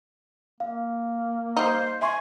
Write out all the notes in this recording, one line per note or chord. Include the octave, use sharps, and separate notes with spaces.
A#3 F5
G3 D#4 C5
E5 G#5 C6 C#6